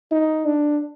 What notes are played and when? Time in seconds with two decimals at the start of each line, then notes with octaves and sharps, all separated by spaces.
0.12 D#4
0.46 D4